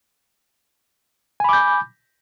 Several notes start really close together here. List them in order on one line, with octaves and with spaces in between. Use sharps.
G#5 B5 D6 G6